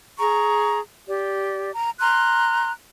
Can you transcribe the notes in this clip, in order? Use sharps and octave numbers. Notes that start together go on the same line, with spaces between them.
G#4 A#5 C#6
G4 D5
A#5
A#5 C6 F6 F#6